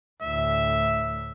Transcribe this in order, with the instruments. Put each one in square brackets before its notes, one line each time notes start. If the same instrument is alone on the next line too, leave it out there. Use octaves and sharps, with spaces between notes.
[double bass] D2 A2 [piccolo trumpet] E5